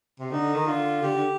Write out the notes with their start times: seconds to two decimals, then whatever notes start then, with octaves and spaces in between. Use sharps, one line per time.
0.20 C3
0.31 D3 D#4
0.55 D#3
0.67 D3 F4
1.02 D3 G4
1.16 D3